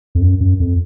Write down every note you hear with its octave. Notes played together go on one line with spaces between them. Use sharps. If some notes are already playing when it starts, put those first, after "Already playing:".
F2
F#2
F#2
F2